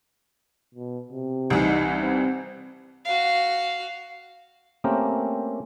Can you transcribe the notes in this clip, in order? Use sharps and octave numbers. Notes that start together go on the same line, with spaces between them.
B2
C3
C2 E3 D#4
C3 C4
F#4 F5
A3 A#3 C4 C#4 G4 A#4